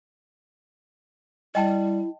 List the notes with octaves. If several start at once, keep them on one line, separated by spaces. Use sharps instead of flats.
G3 E4 D#5 G5 A5